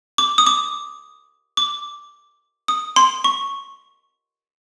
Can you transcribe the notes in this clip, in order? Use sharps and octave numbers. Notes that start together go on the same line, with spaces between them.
D6
D#6
D6
D6
D#6
C6
C#6